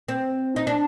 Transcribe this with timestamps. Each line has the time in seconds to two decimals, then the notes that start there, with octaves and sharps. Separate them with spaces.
0.08 C4
0.56 D#4
0.67 D4